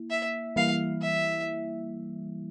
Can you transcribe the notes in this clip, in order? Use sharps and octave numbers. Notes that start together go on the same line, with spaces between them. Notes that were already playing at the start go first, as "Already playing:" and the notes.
Already playing: A#3 E4
E5
E3 G3 A#3 E4 F5
E5